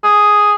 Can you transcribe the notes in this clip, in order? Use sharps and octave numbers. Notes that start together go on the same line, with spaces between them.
G#4